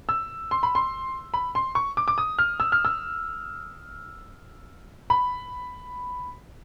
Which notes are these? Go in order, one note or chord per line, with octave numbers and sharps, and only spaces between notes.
E6
C6
B5
C6
B5
C6
C#6
D6
D6
D#6
F6
E6
F6
E6
B5